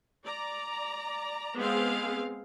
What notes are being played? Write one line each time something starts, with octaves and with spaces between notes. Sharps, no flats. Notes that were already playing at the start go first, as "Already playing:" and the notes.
D5 A#5
G#3 B3 C4 G#4 F5